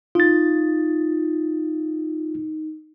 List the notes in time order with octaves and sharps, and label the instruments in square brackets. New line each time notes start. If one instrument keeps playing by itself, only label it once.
[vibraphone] D#4 [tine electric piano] F4 A6